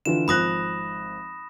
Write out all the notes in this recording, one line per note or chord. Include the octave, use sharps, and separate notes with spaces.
D3 E3 F4 E7
G#1 F3 B5 D#6 F#6 A#6